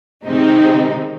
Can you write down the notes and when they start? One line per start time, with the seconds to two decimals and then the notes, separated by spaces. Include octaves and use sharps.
0.24 C3 D#3 G#3 C4 D#4